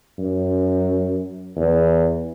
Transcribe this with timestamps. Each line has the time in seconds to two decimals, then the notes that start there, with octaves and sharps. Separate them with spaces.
0.19 F#2
1.56 E2